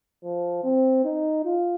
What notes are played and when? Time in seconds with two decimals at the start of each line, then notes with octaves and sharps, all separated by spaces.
0.24 F3
0.64 C4
1.05 D#4
1.45 F4